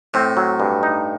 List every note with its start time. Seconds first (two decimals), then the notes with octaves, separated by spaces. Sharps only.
0.14 A2 C4
0.37 F#3
0.60 G2
0.83 D#4